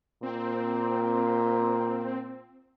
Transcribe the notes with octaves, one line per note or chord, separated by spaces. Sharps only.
A#2 C4